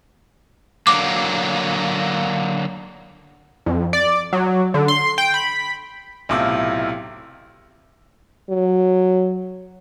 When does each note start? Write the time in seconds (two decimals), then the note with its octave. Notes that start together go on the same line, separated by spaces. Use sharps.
0.87 D3 F#3 A#3 D6
3.66 F2
3.93 D5
4.33 F#3
4.74 D3
4.88 C6
5.18 G5
5.34 B5
6.29 B1 A2 C3 E4 F4 D6
8.50 F#3